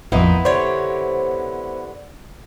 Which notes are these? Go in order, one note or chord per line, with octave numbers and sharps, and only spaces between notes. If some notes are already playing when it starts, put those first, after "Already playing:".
A1 F2 A#3 B3 D#4 E4
D3 G4 C5 C#5